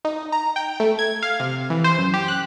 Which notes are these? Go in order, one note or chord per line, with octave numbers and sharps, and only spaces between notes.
D#4
A#5
G5
A3
G#6
F5
C3
E3
C5
F#2
G4
F#6